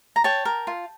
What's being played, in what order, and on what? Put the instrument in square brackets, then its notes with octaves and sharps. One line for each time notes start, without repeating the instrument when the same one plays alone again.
[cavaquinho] A#5
C#5 G5 A5
A#4
F4